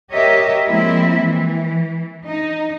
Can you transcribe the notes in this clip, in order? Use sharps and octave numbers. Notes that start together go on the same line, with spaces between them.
G4 A#4 C#5 D#5 E5
F3 G#3 A#3 C4 E4 E5
E3
D#4